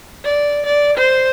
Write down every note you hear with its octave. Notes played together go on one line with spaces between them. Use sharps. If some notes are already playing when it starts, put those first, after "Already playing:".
D5
D5
C5